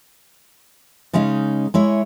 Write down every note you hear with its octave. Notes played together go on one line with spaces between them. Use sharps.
C#3 G#3 C#4 D#4
G#3 E4 C#5